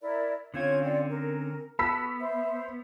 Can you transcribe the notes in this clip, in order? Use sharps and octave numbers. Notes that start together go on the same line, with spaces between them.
E4 A#4 D5
D3 C4 C#4 F4 C#5 G#6
F4 D5 G5
A#4
B3 F#4 A5 B5 E6 B6
C5 E5